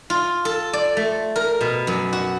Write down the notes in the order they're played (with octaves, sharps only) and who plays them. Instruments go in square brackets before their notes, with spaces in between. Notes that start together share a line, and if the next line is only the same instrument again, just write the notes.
[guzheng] F4
A4
D5
A3
A#4
B2
F#2
F#4